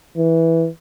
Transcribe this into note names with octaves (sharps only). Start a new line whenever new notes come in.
E3